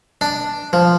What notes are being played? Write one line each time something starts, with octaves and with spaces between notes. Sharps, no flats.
D4
F3